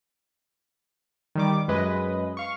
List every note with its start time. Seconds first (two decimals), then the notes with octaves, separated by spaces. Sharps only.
1.35 D#3 G3 D6
1.68 F#2 G#3 B4 D#5
2.37 F5 C#6